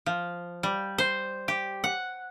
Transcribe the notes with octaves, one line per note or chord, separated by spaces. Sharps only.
F3
G3
C5
G4
F#5